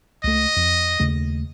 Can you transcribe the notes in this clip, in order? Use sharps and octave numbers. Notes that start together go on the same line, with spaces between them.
C#2 A3 D#5
F2
D#2 C#3 A3